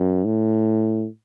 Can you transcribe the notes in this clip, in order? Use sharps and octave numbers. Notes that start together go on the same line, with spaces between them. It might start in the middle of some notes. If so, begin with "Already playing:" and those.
Already playing: F#2
A2